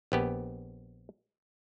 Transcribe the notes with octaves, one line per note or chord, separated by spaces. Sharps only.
A#1 B3 G4